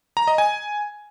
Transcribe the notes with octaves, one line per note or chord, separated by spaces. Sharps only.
A#5
D#5
G#5